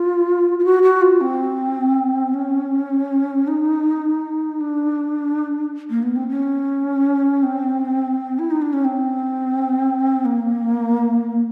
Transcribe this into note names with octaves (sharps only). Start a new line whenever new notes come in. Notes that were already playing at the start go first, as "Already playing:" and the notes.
Already playing: F4
F4
F#4
F#4
F4
C4
C#4
D#4
D4
A#3
B3
C4
C#4
C4
E4
D#4
D4
C#4
C4
A#3